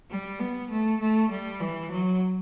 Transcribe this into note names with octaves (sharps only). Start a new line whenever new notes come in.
G3
B3
A3
A3
G3
E3
F#3